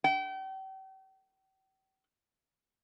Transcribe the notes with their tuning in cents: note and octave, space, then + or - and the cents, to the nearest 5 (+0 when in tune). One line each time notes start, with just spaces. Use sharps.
G5 -40